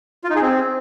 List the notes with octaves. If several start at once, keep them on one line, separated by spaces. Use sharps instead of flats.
F4
D#4
G#4
C4